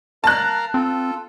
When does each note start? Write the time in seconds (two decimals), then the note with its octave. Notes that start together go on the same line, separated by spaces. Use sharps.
0.24 A#4 F5 A5 A#5 F#6
0.74 C4 F4 A4